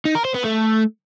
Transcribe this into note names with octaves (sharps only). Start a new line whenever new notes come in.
D#4
A#4
C5
B3
A3